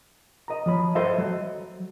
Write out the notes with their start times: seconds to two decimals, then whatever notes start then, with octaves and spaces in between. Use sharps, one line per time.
0.48 D#5 A#5
0.66 F3 F#3 B5
0.95 A4 C5 D#5 E5
1.18 F#3